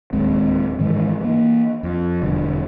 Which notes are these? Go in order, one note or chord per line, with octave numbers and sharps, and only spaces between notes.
D1 D#2 G#3 C4
G#2 D#3 E3 G#3
E3 A#3
F2
E1 D3 G3